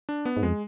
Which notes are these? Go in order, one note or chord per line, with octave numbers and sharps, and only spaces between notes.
D4
B3
G#2
F2 G#3